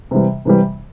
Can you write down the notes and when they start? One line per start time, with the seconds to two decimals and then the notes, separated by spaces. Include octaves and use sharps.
0.11 C3 E3 G3
0.45 C3 E3 G3